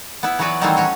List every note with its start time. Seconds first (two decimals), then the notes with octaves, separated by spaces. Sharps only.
0.23 B3 E4
0.39 E3 F#3 B3 F#4 B4 D5
0.61 D#3 E3 F#3 G3 A3 C4
0.77 C#4 F#4 C#5